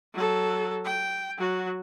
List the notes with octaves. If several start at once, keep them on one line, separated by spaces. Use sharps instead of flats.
F#3 A4
G5
F#3 F#4